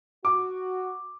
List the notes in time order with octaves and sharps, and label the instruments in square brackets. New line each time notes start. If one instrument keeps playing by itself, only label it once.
[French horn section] F#4 [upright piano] D6